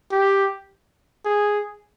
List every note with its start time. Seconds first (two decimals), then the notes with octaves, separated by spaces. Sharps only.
0.11 G4
1.25 G#4